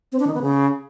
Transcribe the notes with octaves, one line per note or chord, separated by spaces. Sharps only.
C4
D4
D#3
B3
C#3